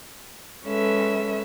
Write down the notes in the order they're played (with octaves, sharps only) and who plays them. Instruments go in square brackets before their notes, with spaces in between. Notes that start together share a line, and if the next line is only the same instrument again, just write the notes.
[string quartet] G#3 C#4 A4 B4 E5